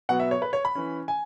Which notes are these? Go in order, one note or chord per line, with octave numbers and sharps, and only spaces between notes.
B2 F#3 B3 F#5
E5
C#5
B4
C#5
B5
E3 C#4
G#5